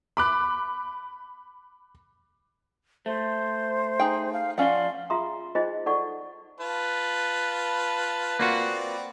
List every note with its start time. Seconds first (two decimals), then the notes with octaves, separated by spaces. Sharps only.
0.17 B5 D6 F#6
3.06 A3 C5
4.00 D#4 G#4 G5
4.33 F5
4.58 F3 C#4 D5 F5 F#5 C6
5.10 F4 G#4 E5 A#5 C6 D#6
5.55 D4 D#4 F4 G#4 C5 D#5
5.86 D#4 A4 D5 F#5 C#6
6.60 F4 B4 A5
8.39 A#3 C4 F4 F#4 D5